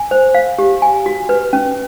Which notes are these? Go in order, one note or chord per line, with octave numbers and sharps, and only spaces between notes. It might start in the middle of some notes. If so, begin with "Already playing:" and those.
Already playing: G#5
C5
F5
G4
G#5
F#4
B4
C#4